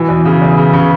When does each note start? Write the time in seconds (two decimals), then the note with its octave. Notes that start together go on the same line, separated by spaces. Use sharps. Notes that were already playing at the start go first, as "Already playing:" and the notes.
Already playing: B2 E3
0.08 E2
0.25 C#3
0.41 E2
0.57 C#3
0.73 C#3